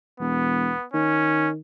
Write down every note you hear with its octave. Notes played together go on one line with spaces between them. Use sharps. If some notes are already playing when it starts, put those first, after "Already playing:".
E1 B3
D#3 C#4